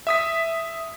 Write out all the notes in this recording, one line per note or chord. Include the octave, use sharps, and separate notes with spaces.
E5 D#6 B6